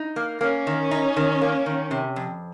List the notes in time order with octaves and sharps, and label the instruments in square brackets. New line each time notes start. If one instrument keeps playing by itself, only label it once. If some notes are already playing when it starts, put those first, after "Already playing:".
Already playing: [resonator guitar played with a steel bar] D#4
A#3
[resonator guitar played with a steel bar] A#3 [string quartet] C#4
[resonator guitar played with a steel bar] D#3
D#4
D#3
A#3
D#3
C3
F2